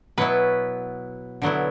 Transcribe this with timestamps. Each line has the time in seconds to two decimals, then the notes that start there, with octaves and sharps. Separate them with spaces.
0.18 B2 F#3 B3 E4 B4
1.42 D3 F#3 B3 E4